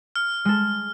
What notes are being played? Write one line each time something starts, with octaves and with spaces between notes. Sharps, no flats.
F6
G#3 A4